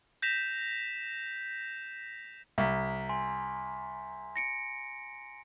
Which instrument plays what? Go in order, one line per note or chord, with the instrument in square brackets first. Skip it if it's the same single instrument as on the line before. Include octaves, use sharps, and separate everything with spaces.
[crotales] G6 A#6 B6 E7 F7
[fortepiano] C2 [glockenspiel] A#5 B6
[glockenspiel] G#5 C6
A#6 C#7 D7